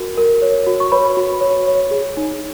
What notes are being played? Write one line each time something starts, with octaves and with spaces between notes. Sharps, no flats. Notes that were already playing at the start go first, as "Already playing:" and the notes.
Already playing: F#4 A#4
A#4
C#5
F#4
C#6
B4 C#5 B5
F#4
C#5
C#5
G#4
D#4